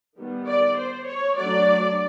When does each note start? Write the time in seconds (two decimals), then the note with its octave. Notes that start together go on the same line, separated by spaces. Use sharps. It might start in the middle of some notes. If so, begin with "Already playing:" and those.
0.18 D#3 G3 B3
0.48 D5
0.78 C5
1.07 C#5
1.37 F#3 A3 D4 D5